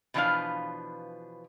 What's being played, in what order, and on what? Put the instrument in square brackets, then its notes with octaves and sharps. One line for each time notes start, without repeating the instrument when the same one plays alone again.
[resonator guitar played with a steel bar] B2 E3 F3 D4 B4 F5